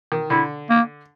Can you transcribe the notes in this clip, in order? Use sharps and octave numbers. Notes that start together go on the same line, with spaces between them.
D#3
D3 E4
A#3